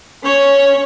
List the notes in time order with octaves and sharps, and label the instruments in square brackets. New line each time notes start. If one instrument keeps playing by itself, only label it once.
[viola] C#4 C#5